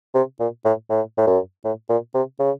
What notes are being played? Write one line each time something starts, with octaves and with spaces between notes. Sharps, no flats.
C3
A#2
A2
A2
A2
F#2
A2
A#2
C3
C#3